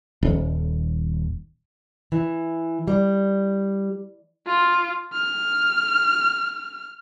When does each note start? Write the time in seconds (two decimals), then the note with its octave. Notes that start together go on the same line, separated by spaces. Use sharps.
0.23 D#1
2.12 E3
2.88 G3
4.47 F4
5.14 F6